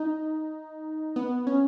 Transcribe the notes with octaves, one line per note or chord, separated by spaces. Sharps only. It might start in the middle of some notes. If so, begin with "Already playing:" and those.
Already playing: D#4
B3
C#4